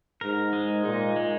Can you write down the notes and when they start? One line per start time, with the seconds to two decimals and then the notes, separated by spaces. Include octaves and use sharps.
0.21 G#2 A#4
0.53 G#3
0.85 A#2 D#4
1.16 G#3